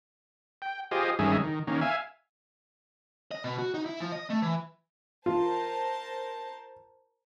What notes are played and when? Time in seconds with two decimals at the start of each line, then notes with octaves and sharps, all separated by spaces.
0.62 G5
0.91 F4 G4 G#4 C5 D#5
1.19 G2 D#3 G#3 C#4 G#4 E5
1.44 D#3
1.67 D#3 A#3 C#4
1.81 E5 F5 G#5
3.31 D#5
3.44 B2
3.58 F#4
3.74 D#4
3.86 E4
4.00 F3
4.12 D#5
4.30 A3
4.42 E3
5.26 F4 A#4 C5 A5